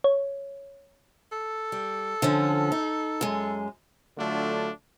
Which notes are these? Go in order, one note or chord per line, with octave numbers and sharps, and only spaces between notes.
C#5
A4
G3
D3 F3 C#4
D#4
F#2 G#3
D3 F#3 A3 D4 F4